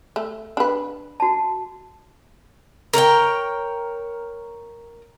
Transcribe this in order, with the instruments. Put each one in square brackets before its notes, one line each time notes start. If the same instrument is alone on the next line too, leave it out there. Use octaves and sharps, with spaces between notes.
[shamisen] A3
D4 B4
[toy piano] F#4 A5
[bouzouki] A#4 C#5 F#5 G5